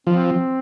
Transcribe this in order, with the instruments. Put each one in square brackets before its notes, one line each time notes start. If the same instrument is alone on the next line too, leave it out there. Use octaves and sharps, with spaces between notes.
[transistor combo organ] F3 [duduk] C4